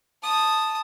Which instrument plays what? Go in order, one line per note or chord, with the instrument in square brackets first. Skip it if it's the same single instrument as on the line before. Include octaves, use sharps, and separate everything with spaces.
[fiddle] A5 D#6